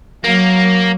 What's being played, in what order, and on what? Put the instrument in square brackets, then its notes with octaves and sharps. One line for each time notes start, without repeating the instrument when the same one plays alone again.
[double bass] F#3 [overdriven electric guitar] A#3